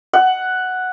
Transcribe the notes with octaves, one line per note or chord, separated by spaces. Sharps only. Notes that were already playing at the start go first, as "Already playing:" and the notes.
F#5